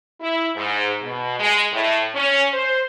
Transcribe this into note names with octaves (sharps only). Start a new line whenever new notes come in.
E4
G#2
B2
G#3
A2
C#4
C5